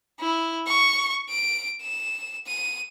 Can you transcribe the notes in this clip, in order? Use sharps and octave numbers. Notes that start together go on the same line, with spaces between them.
E4
C#6
D7
E7
D#7